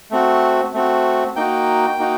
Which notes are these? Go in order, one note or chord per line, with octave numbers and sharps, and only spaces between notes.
A3 C4 F#4
A3 C4 F#4
A#3 D#4 F#4 G5
A#3 D#4 F#4